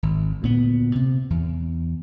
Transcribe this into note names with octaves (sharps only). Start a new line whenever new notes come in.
G#1
D2 A#2 B3
C3
E2